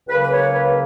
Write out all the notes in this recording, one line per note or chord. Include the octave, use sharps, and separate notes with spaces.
C#2 C#3 F#3 A#3 B4
B4
C#5
B4